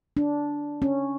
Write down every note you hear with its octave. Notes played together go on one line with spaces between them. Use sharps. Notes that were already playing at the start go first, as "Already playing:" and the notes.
D4
C#4